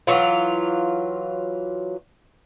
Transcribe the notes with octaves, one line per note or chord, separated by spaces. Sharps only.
E3 F#3 F4